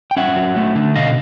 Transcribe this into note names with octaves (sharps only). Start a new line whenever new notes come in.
G5
C#4 E5 F#5
F#3
A3
D3
B2 D#5 F5